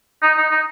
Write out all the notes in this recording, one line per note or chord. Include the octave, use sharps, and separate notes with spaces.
D#4
D#4
D#4